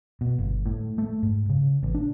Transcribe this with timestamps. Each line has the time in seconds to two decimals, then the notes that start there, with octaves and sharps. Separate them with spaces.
0.21 B2
0.39 G1
0.66 A2
0.98 A3
1.23 G#2
1.49 C#3
1.83 A1
1.94 D4